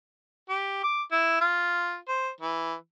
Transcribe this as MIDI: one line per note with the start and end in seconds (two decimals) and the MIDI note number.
0.49 0.79 67
0.83 1.03 86
1.12 1.37 64
1.41 1.97 65
2.08 2.30 72
2.41 2.74 52